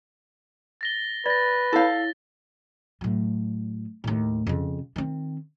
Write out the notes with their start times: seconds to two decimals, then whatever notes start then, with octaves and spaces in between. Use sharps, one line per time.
0.81 A6 A#6 G7
1.26 B4 D5 A6 A#6
1.73 E4 A4 C#5 F5
3.01 A2 F#3
4.04 D#2 A2
4.47 F2 C#3
4.96 D#3 C4